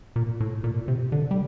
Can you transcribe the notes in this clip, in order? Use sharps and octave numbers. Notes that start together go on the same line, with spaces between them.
A#2
A2
A#2
C3
D3
G3